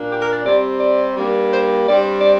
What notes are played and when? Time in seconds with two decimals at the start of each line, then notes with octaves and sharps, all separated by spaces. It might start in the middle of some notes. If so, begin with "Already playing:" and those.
Already playing: A#2 A#3 D4
0.09 G4
0.21 A#4
0.33 D5
0.45 C3 G3 C4 D5
0.80 D5
1.15 G2 G3 A#3
1.51 C5
1.86 G2 G3 C4 D5
2.21 D5